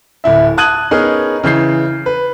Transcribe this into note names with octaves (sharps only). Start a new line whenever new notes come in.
D1 E4 E5
A5 D#6 F#6 G#6 D#7 F#7
B3 C#4 D#4 G#4 A#4
C#3 E3 G6 C7
B4